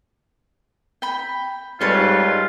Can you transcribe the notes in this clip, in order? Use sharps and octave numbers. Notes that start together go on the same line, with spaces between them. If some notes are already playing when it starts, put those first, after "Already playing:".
G5 B5
G#2 G3 F4 A4 B4 C#5 A5